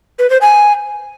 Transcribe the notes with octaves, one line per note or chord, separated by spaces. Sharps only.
B4
C5
G#5